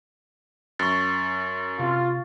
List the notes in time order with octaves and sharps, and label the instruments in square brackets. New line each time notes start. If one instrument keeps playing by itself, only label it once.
[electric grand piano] F#2 [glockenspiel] C#6 A6
[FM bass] C3 [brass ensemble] F4